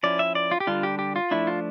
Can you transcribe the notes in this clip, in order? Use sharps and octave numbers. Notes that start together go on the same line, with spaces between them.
F3 C#4 E4 D5
E5
D5
F4
G4
D3 G3 D4 F4
G4
G4
F4
F3 A3 D4 E4
F4